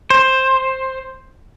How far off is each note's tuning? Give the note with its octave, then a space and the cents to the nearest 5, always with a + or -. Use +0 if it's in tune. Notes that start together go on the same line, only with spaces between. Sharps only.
C5 +10